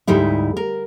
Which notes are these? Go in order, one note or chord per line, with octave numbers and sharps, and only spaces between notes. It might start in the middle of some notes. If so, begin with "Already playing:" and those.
D2 G#2 G3 D#4 E4
A#4